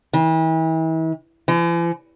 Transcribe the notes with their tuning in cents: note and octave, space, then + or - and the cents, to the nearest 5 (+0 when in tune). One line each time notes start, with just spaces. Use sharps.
E3 -40
E3 +45